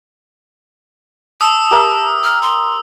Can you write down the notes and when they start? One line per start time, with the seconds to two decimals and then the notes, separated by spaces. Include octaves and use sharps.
1.41 A5 D#6 E6
1.71 G4 A#4 E5
2.24 F6
2.42 C6